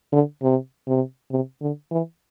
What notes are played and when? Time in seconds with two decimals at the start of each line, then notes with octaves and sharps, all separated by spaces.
0.12 D3
0.42 C3
0.87 C3
1.31 C3
1.61 D3
1.91 E3